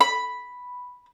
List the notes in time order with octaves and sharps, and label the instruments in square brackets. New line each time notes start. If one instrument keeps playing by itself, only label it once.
[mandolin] B5